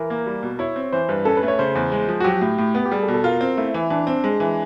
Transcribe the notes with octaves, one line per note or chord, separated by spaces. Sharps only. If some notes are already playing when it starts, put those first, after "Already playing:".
Already playing: E3 A#4
A#3
G3
B2
E4 C#5
C4
E3 C5
G2 B4
C#4 A4
B4
A3
C#5
C#3 C5
E2
G#3
F3
F#4
F#3 G4
A2
A2
B3
G4
G3 G#4
A4
B2
A4
F4 A#4
C4
A3 E4
E3
E3 D4
C4
G#3
E3